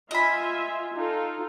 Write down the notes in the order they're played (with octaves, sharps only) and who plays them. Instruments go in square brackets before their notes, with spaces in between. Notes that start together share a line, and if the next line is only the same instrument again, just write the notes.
[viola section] F4 E5 G#5 [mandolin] D#5 B5
[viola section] D#4 F4 A4